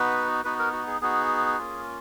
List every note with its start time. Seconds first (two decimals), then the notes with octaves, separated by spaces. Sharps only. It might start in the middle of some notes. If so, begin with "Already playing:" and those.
Already playing: B3 D#4 F#4 B4
0.44 B3 D#4 F#4 B4
0.59 A#4
0.73 F#4
0.87 G#4
1.01 B3 D#4 F#4 G#4
1.58 A#3 C#4 F4